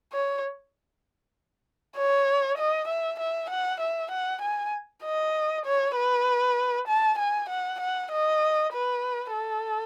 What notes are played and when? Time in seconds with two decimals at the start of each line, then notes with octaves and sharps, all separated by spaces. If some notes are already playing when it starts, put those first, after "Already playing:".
0.13 C#5
1.97 C#5
2.58 D#5
2.88 E5
3.20 E5
3.50 F#5
3.80 E5
4.11 F#5
4.42 G#5
5.04 D#5
5.66 C#5
5.96 B4
6.88 A5
7.18 G#5
7.50 F#5
7.81 F#5
8.12 D#5
8.73 B4
9.34 A4